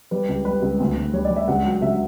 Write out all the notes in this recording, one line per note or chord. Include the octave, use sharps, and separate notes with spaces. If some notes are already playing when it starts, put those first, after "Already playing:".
G3 B4
C#2
G3 B4
C#2
D2
D2
G3 C#5
D5
G3
E5
C#2 F#5
F#3
C#2 E5